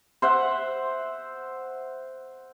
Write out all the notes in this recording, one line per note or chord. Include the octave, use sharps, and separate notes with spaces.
C5 E5 F#5